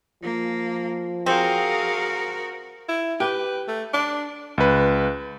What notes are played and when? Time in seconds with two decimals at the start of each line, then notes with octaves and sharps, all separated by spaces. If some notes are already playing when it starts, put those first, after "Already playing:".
0.23 F3 A#3
1.26 C4 F#4 G#4 A#4 F5
2.89 E4
3.20 G4 B4
3.68 A3
3.94 D4
4.58 C#2 B4